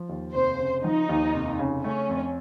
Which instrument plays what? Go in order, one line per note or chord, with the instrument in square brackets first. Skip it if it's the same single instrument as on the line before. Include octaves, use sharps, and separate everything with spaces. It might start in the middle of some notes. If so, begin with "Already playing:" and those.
Already playing: [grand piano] F3
D#2
[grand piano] F1 [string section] C5
[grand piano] C#3
[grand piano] F3 [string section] D#4
[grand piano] D#2
F1
C#3
[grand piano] A3 [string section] C#4
[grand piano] F2